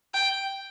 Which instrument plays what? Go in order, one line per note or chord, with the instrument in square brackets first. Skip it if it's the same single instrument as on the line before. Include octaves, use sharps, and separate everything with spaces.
[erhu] G5